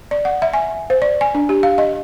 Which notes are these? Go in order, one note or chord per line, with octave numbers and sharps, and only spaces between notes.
D5
F#5
E5
G#5
C5
D5
G#5
D4
G4
F5
D#5